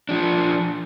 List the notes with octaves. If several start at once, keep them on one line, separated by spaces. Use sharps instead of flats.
F3 D4